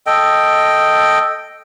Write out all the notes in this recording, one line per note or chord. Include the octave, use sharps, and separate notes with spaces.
A4 D#5 G5